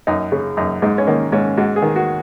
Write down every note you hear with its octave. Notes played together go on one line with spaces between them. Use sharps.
F#2 D#4
C#3
F#2 D#4
G#2 D#4
C#4
D#3 A#3
G#2 C#4
G#2 F#4
G#4
D#3
F#4